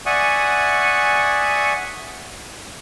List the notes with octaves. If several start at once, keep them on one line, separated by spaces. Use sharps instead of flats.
D5 E5 F#5 G#5 C#6 D#6